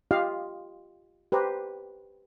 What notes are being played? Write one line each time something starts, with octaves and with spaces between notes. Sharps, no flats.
F4 G4 D#5 F5
G4 B4 C5 A#5